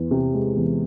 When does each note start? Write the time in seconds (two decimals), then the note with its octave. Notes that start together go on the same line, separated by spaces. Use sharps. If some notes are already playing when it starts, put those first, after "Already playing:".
Already playing: E2 E3
0.11 C3
0.34 G#3
0.56 E2